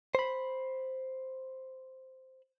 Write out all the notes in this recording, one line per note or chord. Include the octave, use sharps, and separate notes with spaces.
C5 B5